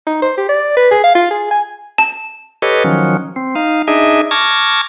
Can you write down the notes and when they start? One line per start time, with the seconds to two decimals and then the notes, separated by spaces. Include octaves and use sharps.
0.07 D#4
0.22 C5
0.37 G4
0.49 D5
0.76 B4
0.91 G#4
1.04 F5
1.15 F4
1.30 G#4
1.51 G#5
1.98 A5
2.62 G4 A4 B4 C#5 D#5
2.84 D#3 F3 F#3 C#4
3.36 C4
3.55 D#4 F5
3.88 D4 D#4 G#4 D#5 E5
4.31 A5 C#6 D6 F6 G#6 A#6